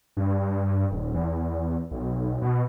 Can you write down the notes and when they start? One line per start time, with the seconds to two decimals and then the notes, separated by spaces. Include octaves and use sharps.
0.17 G2
0.91 D#1
1.14 E2
1.91 B1
2.42 B2